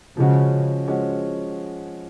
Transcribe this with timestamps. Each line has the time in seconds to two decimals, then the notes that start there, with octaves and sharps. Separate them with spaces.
0.17 C#3 F3 G#3 C#4 F#4
0.88 F3 G#3 C#4 F#4